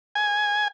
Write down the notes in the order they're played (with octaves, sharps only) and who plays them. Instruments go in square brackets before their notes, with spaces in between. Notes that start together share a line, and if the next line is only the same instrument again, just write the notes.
[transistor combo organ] G#5